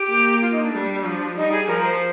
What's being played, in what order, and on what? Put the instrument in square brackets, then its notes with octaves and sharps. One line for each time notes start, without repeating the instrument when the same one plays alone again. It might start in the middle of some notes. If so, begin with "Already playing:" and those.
Already playing: [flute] G4
[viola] A#3
[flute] F4
D#4
D4
[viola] G3
F3
[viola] G3 [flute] D#4
[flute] G#4
[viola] F3 [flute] A#4
[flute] C5